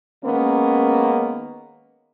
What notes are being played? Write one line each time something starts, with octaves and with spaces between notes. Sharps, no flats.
D#3 G#3 A#3 B3 C#4